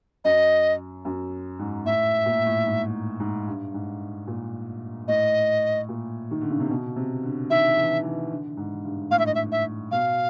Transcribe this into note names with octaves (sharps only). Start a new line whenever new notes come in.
F#2 D#5
F#2
G#2
A2 E5
A#2
A2
G#2
G#2
G2
G#2
A#2
A2 D#5
A#2
D#3
D3
C#3
C3
B2
C3
D3
D#3 E5
E3
E3
D3
G#2
G2
A2 F5
E5
D#5
E5
E5
B2 F5